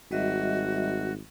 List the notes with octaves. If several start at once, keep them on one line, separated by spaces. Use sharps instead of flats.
G#1 G3 F#4 D#5 E5